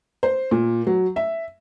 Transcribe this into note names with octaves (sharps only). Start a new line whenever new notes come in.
C5
A#2
F#3
E5